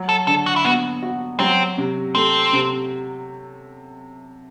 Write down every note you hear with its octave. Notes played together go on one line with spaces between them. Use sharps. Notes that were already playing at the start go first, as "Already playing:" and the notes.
Already playing: F#3
A4
D3 A4
F#4
E4
B3 F#4
F#4
F#3 C4
C3
A3 C4
C3